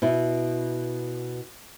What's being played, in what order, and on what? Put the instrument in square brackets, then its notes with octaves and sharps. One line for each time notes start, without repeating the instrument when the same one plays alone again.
[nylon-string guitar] B2 E4